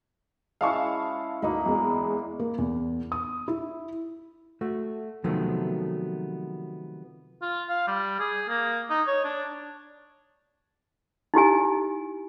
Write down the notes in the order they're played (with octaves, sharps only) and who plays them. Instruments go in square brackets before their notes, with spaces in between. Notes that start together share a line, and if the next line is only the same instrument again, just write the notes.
[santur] G#3 C#4 E4 [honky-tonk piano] F5 A5 C#6
[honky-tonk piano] D2 D#4 [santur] A#3 B4 B5
[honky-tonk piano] E2 G#3
[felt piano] A#3
E2
D#6
E4
[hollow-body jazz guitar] A3 F#4
C3 D#3 F3 F#3 A3 B3
[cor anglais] F4
F5
G3
G#4
A#3
D#4
C#5
D4
[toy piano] D#4 E4 G4 G#5